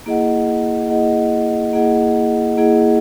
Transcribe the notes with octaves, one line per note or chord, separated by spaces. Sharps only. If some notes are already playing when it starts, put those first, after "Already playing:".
A#3 E4 G#4 D#5 F#5
A#3 E4 G#4 D#5 F#5
A#3 E4 G#4 D#5 F#5
A#3 E4 G#4 D#5 F#5